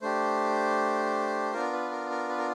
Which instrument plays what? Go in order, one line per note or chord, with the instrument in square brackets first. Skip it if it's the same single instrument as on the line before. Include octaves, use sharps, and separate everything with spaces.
[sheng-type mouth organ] A3 D4 G4 C5
B3 D4 F4 A#4
B4
A#4
A#4
B4
A#4